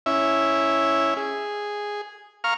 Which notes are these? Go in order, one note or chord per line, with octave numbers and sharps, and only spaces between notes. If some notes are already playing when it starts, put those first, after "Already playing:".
C#4 E4 E5
G#4
F5 A#5 C#6 F6